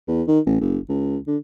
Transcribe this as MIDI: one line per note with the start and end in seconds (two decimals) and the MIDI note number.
0.08 0.22 40
0.27 0.39 51
0.46 0.57 33
0.61 0.78 30
0.89 1.17 37
1.27 1.37 50